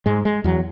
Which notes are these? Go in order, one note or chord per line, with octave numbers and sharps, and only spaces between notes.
G#2 G#3
G#3
E2 F#3